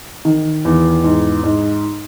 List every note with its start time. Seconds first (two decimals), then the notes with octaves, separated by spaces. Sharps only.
0.25 D#3
0.65 E2
1.04 G#2
1.43 G#2